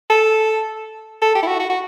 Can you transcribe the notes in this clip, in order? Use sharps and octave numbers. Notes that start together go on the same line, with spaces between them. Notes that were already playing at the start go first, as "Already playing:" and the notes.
A4
A4
G4
E4
F#4
F#4
F#4